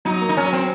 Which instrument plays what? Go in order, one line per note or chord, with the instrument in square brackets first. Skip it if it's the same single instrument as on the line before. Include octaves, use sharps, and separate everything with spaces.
[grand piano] F#3 [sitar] D#4
[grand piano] A#3
[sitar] D#4
[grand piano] F#3 [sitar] C#4
[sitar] C4 [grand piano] C#4